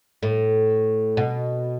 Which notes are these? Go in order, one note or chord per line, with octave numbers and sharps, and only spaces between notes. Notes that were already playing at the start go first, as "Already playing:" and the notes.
A2
B2